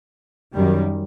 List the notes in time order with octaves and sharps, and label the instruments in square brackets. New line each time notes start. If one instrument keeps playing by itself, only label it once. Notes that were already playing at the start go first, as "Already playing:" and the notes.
[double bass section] F#2 D#3 G3